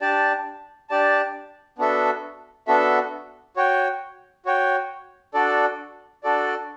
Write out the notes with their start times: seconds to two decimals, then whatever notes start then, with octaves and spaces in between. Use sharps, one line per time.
0.01 D4 G4 D5 A5
0.90 D4 G4 D5 A5
1.78 B3 D4 F#4 A4 E5
2.67 B3 D4 F#4 A4 E5
3.56 F#4 C#5 G5
4.46 F#4 C#5 G5
5.34 D4 F#4 A4 D5
6.23 D4 F#4 A4 D5